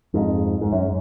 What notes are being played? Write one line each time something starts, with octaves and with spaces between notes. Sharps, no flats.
F2 G#2
G#2
F#2